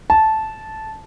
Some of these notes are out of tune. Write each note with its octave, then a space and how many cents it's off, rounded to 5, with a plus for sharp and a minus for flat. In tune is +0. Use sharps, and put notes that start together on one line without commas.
A5 -10